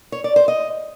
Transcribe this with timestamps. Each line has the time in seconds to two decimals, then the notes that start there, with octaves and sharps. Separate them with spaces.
0.12 C#5
0.24 D5
0.36 C5
0.48 D#5